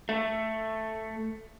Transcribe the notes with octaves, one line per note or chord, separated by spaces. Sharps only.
A3